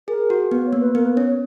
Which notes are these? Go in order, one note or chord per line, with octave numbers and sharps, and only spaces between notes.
G#4 A#4
F#4
B3 B4
C#5
A#3
B4
B3 A#4
B4
C#4 C#5
C#5